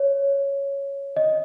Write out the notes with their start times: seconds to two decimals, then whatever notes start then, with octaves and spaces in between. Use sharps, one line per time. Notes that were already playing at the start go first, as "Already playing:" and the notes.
Already playing: C#5
1.16 D#5